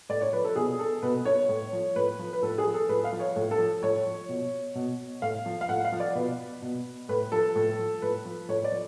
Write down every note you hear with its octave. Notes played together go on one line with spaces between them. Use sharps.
A2 D5
C#5
F3 B4
A4
B2 G#4
A4
B2 B4
C#5
A2
F3
A2 B4
F3
B4
A2 A4
G#4
F3
A4
A2 B4
F5
F3
C#5
A2
A4
F3
A2 C#5
F3
B2
B2
A2 F5
F3
F5
A2 F#5
F5
F3
D5
B2 B4
B2
A2 B4
F3 A4
A2
F3
A2 B4
F3
A2 C#5
D5
F3